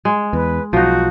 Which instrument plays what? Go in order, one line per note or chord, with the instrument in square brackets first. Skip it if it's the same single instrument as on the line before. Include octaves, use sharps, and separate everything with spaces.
[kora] G#3
[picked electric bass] E2 [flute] B4
[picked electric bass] B1 [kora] F3 D#4 [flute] F#4